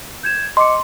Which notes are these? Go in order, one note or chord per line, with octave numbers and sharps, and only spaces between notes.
G6 G#6 E7
D#5 C6 D6 C#7